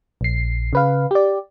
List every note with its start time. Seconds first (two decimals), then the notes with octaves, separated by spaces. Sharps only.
0.21 A#1 C7
0.73 C#3 B4 F5
1.11 G4 D5